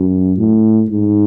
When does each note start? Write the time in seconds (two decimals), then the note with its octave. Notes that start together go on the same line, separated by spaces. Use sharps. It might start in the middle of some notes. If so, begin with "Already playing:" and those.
Already playing: F#2
0.38 A2
0.91 G#2